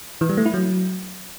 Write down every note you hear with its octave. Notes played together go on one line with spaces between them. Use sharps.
E3
G3
A3
E4
F#3